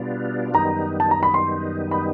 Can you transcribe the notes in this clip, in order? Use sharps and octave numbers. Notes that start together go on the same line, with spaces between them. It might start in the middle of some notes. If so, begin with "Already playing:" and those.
Already playing: B2 G3 B3 D4 F4
F#2 D#3 G3 B3 D#4 A#5
A5
A#5
B5
C6
B5